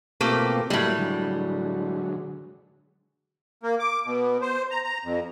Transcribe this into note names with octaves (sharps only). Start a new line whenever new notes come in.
B2 A3 A#3 C4 F4 G4
A2 F#3 G3 A3 A#3
D3 F#3 G#3
A#3
D6
B2
C5
A#5
A#5
F2